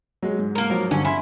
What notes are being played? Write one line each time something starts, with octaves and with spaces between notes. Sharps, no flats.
F#3 G#3
G#2
A#3 A#4
F3 F#3
G2 D3 C#4
E4 G#5 B5 C6